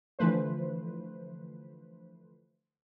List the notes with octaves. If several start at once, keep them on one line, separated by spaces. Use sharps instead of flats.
D3 E3 F3 A3 B4 C5